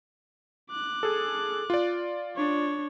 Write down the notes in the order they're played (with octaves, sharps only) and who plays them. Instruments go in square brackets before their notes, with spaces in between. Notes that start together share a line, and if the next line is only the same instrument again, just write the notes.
[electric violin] D6 F#6
[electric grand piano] G#4 A4
F4 D5
[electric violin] D4 C#5